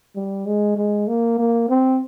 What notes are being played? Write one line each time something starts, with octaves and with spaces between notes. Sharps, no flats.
G3
G#3
G#3
A#3
A#3
C4